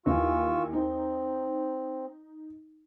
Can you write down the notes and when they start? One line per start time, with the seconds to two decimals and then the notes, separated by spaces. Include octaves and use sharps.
0.06 D#2 E3 F4 C#6 E6
0.73 C4 D#4